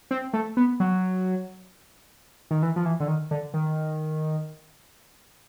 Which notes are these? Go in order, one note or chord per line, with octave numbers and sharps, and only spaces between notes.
C4
A3
B3
F#3
D#3
E3
F3
E3
D3
D#3
D3
D#3